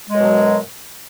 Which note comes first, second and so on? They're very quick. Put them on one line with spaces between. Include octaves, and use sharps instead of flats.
G#3 F#2 B2 F#3